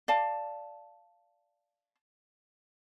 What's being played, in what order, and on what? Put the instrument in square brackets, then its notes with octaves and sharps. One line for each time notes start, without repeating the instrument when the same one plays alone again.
[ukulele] D5 F5 A5